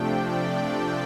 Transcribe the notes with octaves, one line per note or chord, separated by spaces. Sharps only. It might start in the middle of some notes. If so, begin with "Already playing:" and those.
Already playing: C3 F3 A3 D4 G5
D5
G5